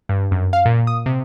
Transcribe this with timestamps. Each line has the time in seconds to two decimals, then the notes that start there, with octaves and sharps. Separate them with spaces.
0.09 G2
0.31 F#2
0.53 F5
0.66 A#2
0.87 D#6
1.06 C3